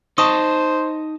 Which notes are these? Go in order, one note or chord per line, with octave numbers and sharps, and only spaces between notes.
D#4 C5 D#5 A5 C6 C#6 D#6